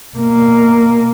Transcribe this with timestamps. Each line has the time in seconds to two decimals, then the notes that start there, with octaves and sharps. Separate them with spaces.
0.16 B2 A#3